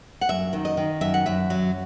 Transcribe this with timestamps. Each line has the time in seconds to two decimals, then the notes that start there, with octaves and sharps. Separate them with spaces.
0.21 F#5
0.29 F#2 E5
0.53 D#3
0.65 D#5
0.77 D#3
1.01 F#2 E5
1.14 F#5
1.26 F#2 E5
1.50 F#3